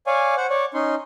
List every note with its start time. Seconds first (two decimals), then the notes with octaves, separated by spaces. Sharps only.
0.07 C#5 D5 F5 G#5
0.37 C5 F#5
0.50 C#5 D5
0.74 C#4 D#4 C6